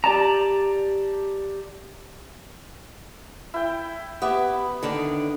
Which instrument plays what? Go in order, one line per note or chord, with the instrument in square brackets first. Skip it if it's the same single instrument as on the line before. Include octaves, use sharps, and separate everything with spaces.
[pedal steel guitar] G4 D5 A5 A#5
[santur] E4 G5
[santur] B3 [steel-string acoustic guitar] G4 E5
[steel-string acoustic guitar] D3 D#3 D4